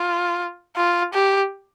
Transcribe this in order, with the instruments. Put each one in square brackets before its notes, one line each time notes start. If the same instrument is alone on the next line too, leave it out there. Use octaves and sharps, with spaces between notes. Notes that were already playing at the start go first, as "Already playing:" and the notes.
Already playing: [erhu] F4
F4
G4